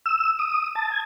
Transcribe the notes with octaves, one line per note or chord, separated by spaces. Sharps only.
E6
D#6
A5
G#6